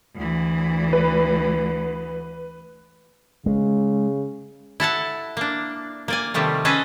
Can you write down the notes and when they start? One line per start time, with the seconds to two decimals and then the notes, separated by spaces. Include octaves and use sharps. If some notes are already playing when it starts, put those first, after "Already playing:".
0.16 D2 E3
0.93 B4
3.46 C#3 G#3
4.80 E4 A4 F#5 A5
5.37 A#3 D4
6.08 A#3 D5 G#5
6.34 C3 D#3 F3 G3 A3
6.65 C#4 G#4 A4 B4 D#5